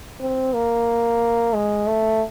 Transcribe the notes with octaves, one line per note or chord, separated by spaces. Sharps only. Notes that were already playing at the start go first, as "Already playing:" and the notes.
C4
A#3
G#3
A3